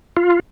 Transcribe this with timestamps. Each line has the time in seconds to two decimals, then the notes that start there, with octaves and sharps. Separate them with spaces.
0.17 F4